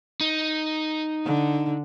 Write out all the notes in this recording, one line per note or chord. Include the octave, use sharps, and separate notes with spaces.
D#4
D3